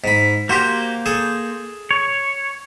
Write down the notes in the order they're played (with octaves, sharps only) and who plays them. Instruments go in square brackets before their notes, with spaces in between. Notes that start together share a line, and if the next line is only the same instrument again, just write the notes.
[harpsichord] G#2 B5
[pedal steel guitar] A#3 C5 [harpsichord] F#4 G4
[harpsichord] G#4 A4
[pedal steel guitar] C#5